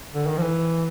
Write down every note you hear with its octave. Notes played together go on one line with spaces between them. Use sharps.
D3
D#3
F3
E3